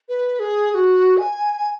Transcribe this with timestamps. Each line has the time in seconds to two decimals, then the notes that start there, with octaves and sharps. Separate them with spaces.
0.09 B4
0.39 G#4
0.71 G#4
0.74 F#4
1.17 G#5